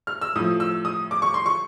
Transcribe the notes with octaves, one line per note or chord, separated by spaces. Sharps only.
F6
E6
A2 F3 D#6
E6
D#6
D6
C#6
C6
C#6